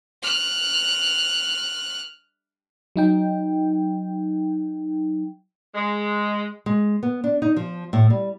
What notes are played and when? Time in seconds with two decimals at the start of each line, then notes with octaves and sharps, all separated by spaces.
0.23 F6 F#6
2.96 F#3 D#4 G5
5.75 G#3
6.66 G#3
7.03 B3
7.24 D4
7.42 D#4
7.57 F3
7.93 A2
8.10 G3